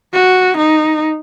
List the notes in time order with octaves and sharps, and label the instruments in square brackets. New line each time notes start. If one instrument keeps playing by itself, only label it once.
[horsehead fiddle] F#4
D#4